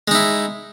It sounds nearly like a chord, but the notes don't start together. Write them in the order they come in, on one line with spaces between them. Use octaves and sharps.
G#3 D#4 E4